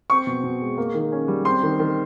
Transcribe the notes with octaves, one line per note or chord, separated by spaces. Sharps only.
C4 C#6
B2
B2
G#3
A#3
D#3
C#4
G3
C4 C6
D#3
D#3